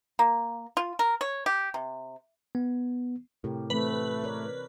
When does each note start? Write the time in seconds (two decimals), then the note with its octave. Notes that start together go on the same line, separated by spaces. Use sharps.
0.19 A#3
0.77 F4
0.99 A#4
1.21 C#5
1.46 G4
1.74 C3
2.55 B3
3.44 A2 C3 G4 A#4
3.70 E3 A3 C4 B4
4.24 A#4 C#5 D5